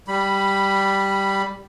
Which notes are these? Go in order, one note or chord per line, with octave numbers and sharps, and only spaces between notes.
G3 B5